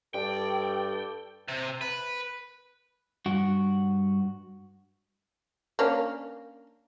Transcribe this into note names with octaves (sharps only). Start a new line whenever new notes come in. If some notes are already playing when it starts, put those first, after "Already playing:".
G2 A4 D5 G5
C3
B4
G2 F#4
A#3 C#4 D4